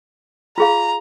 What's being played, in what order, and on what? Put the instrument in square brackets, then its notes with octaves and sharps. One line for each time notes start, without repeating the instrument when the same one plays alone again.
[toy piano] F4 G#4 F5 [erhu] A#5